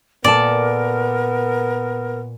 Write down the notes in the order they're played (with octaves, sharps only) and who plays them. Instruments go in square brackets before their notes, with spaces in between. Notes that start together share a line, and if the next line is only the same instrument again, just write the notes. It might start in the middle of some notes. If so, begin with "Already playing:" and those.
[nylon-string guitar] A#2 A4 A5 [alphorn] B3 [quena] A#4 [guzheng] D5